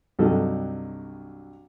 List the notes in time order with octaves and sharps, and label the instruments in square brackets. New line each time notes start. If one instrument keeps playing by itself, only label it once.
[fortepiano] C2 G2 F#3 D#4 A4